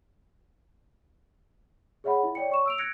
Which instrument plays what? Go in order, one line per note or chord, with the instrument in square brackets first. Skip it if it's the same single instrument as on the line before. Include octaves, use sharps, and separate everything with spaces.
[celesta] G#4 C#5 E5 F#5 B5
E4
C#5 D5 G5 C#7
C#5 C#6 E7
E6 D7 F7
F#6 G#6 A#6 C#7 D7